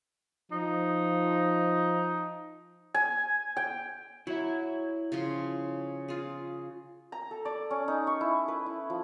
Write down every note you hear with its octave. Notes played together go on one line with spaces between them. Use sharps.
F3 D#4
G#5
G5
F#3 E4 E5
C#3 F3 C6
F4 G#4
A#5
A4
D5
C#4
D#4
C#6
E4
B4
E4
F3